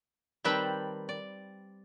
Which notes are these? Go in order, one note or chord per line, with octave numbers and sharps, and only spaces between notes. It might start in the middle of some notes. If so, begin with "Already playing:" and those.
D#3 G3 C4 B4 G5 A5
D5